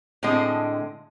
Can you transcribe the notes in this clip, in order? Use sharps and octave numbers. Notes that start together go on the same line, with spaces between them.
A2 D3 G#3 C4 D#5